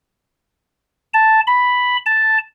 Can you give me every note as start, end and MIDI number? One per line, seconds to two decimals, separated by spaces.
1.14 1.40 81
1.47 1.97 83
2.06 2.38 81